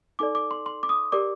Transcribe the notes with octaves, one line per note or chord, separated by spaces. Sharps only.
D#4 A4 D5 D6
D6
C6
C6
D6
D#6
G4 A#4 D5 D6